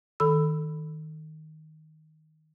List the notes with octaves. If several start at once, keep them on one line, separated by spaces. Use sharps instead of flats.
D#3 A4 B5 E6